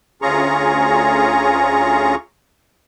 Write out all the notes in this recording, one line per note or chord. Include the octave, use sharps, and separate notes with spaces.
D2 C#4 F4 G#4 A#5 C#6